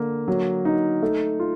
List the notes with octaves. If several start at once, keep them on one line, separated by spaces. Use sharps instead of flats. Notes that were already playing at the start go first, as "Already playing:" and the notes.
Already playing: D3 A#3 D4
F#3
D#4
A3
F4